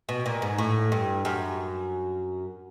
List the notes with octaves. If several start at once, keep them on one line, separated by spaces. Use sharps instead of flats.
B2
A#2
G#2
A2
G2
F#2